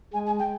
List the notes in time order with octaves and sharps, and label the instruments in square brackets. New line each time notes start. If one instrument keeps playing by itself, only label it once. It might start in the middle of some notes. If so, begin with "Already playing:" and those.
[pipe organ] G#3 [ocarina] G#5
[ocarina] G#5
G5